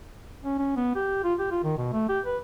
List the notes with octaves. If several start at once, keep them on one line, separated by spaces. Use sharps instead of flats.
C#4
C#4
B3
G4
F4
G4
F4
D#3
B2
A3
G4
B4